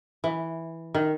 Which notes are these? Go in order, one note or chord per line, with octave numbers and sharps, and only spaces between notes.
E3
D#3